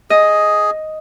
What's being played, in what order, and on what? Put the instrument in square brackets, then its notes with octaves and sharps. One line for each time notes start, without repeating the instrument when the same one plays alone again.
[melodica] G#4 [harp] D#5